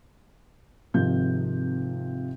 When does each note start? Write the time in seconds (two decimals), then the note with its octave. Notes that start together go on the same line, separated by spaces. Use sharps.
0.94 G#1 C3 F3 F4 G6